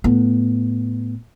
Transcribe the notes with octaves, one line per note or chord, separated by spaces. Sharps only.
A2 B3